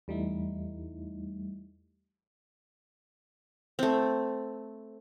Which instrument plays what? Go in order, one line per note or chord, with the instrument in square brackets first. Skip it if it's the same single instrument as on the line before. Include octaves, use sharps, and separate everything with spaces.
[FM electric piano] E2 G3 A3 D#4 E4
[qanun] A3 C4